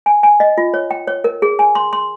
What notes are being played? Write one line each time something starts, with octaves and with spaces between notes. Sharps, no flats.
G#5
G#5
D#5
F4
C#5
G5
C#5
A#4
G#4
G#5
C6
C6